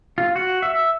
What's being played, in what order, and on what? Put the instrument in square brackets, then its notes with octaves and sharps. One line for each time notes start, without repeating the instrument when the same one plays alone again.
[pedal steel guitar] F4
F#4
E5